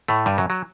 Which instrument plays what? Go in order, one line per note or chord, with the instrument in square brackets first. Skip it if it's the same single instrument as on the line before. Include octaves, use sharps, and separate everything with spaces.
[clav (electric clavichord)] A2 A3
G2 G3
F#2 F#3
F#3